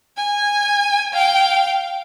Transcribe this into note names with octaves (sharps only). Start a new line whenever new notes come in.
G#5
F5 G5